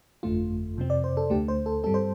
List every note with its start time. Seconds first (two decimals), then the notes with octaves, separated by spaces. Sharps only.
0.23 G1 F2 D3 A3 F4
0.77 F2 C3 F3 C4
0.90 D5
1.04 C5
1.17 A4
1.30 D2 D3 A3 G4
1.48 C5
1.66 A4
1.84 G2 G3 C4 A4
1.94 C5